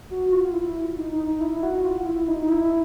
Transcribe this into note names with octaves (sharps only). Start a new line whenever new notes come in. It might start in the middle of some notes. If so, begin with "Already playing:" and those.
F#4
F4
E4
D#4
D#4
D#4
E4
F#4
F4
E4
D#4
D#4
E4